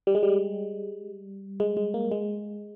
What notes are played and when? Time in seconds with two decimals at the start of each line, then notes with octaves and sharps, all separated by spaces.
0.07 G3
0.15 G#3
0.23 G3
1.60 G#3
1.77 G#3
1.94 A#3
2.12 G#3